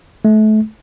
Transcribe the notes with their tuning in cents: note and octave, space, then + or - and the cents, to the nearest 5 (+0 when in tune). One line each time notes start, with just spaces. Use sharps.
A3 -30